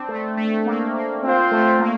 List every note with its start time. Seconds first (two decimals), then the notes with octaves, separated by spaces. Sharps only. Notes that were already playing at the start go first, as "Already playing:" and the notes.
Already playing: C4 D4
0.09 A3
0.37 A3
0.66 A#3
0.95 A#3
1.23 C4 D4 F4 C5
1.52 A3
1.80 A#3